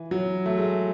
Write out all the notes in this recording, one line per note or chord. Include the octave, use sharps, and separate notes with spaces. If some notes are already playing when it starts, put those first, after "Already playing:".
Already playing: E3
F#3
A3
G#3